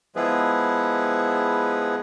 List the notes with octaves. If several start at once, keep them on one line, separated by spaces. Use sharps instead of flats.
F3 G#3 B3 E4 G#4 B4